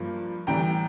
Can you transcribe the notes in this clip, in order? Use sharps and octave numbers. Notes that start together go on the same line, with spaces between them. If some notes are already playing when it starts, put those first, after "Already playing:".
Already playing: G2 F3 A#3
A2 E3 G3 G5 A#5